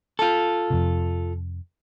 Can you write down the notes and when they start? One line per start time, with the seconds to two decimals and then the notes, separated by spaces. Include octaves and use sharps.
0.19 F4 A4
0.70 F2 C3